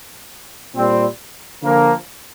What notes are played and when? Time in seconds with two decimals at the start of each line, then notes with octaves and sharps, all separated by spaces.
0.74 A#2 G3 C4
1.62 D3 F3 A#3